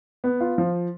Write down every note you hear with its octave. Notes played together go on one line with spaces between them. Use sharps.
B3
F4
F3